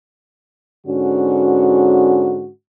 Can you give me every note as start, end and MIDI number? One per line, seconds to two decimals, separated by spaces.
0.87 2.50 44
0.87 2.50 50
0.87 2.50 61
0.87 2.50 66